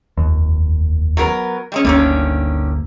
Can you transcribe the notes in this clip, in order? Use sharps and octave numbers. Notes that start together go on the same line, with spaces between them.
F1 D#2
F#3 B3 A#4
G3 G#3 C#4
G1 D2 D3 D#3 A#3 C#4